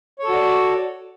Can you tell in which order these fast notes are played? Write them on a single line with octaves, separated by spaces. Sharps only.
C#5 A4 F#4 D5